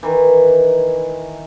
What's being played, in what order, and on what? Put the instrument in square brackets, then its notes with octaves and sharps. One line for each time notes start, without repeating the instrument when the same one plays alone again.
[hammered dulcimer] D#3 E3